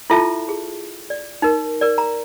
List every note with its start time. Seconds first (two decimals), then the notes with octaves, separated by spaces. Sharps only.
0.10 E4 F4 A4 E5 A5
0.49 G#4
1.10 D5
1.42 D#4 A#4
1.81 A#4 D5
1.98 A#5